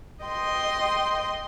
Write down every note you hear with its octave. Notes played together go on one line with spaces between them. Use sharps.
D#5 G5 C6